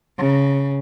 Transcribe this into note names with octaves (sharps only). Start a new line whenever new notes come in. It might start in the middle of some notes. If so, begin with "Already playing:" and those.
C#3